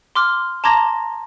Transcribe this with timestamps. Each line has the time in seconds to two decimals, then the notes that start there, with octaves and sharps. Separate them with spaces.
0.15 C6 D6 F6
0.64 A5 A#5 C6 D6 G#6 A#6